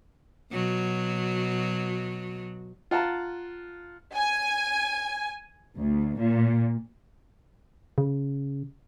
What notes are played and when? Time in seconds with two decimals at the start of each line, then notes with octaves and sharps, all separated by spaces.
0.52 B2 F#3
2.91 F4 F#5 A5 A#5
4.16 G#5
5.77 D2
6.18 A#2
7.98 C#3